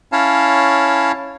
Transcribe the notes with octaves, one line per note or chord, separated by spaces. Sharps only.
C#4 E4 C#5 F5 A5